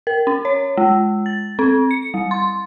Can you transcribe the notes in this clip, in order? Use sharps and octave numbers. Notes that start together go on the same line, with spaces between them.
A#4
C#4
C#5
G#3
A6
C4
C#7
G3
C6